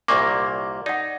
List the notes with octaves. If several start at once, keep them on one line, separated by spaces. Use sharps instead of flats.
C2 A#2 A#3 D5 C#6 D6
D#4 D5 F#5